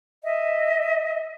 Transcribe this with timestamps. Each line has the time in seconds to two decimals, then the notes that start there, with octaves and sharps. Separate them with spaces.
0.23 D#5 E5